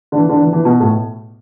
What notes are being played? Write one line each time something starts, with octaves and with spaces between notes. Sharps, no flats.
D3
E3
D3
E3
E3
B2
A2